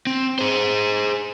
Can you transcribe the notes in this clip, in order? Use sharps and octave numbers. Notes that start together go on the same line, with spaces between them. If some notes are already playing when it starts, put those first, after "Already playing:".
C4
G#4 C5